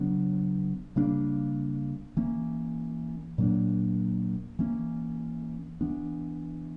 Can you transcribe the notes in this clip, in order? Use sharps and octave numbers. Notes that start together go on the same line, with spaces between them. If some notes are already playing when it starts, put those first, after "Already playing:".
Already playing: C#3 F#3 B3 D4
C#3 G3 A#3 D4
E3 A#3 C#4
A#2 F#3 A#3 D4
E3 A#3 C#4
E3 B3 D4